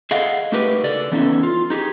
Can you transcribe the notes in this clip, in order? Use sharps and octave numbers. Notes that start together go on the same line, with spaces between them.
G#4 A4 D#5 F5 F#5
A3 D#4 F#4 G4 A#4 B4
C#3 A4 D5
E3 B3 C#4 D#4 E4 A4
F4
D#4 G4 G#4